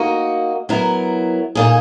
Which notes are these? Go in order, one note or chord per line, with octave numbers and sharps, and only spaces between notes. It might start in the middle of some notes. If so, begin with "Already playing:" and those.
Already playing: A#3 D#4 F#4
F#3 B3 E4 A#4
A#2 A#3 D#4 G#4